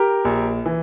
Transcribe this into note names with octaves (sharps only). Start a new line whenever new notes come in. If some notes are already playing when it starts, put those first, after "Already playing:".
Already playing: G4 A#4
A#1
E3